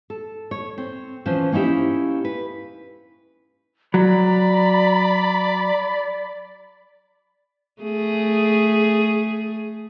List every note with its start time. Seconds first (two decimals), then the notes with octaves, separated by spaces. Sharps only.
0.10 A4
0.51 C#5
0.78 C4
1.26 E3 F3 C#4 C5
1.52 A#3 C#4 D#4 E4 G4
2.25 B4
3.94 F#3 D5 A#5 B5
7.82 A3 G#4